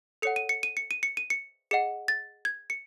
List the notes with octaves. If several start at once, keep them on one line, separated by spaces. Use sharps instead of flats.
A4 C#5 F#5 C#7
D#7
C#7
D#7
C#7
D#7
C#7
D#7
C#7
G#4 D#5 F#5 C#7
A6
G#6
C#7